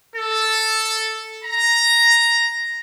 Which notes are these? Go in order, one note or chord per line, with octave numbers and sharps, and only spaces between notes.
A4
A#5